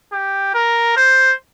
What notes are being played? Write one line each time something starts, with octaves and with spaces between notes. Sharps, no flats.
G4
A#4
C5